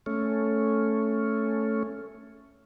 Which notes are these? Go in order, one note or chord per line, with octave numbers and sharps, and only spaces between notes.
A3 C#4